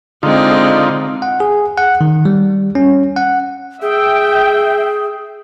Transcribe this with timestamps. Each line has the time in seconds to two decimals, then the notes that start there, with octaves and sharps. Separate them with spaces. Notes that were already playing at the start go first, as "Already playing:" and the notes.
0.23 D3 G#3 C4 D#4 F4
1.22 F#5
1.40 G#4
1.77 F#5
2.01 D#3
2.25 G3
2.75 C#4
3.16 F#5
3.82 G#4 E5 G5